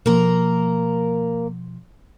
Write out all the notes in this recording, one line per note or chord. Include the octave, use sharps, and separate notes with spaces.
B2 F3 A#3 A#4